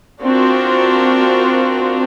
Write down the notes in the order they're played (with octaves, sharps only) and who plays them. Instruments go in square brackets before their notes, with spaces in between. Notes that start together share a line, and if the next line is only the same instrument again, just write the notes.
[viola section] C4 D4 F4 F#4 A#4